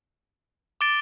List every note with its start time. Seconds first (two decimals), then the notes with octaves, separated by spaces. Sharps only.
0.81 D6 A6 D7 G7